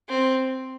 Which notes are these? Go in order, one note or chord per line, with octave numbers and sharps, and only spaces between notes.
C4